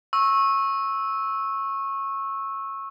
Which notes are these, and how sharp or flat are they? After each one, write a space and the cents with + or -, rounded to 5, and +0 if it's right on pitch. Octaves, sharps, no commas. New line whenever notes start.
C#6 -20 E6 -10